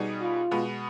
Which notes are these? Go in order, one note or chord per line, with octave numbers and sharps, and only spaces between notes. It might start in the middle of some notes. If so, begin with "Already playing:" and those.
Already playing: B2 G3 B3 D#4 G#4
F4
B2 G#3 B3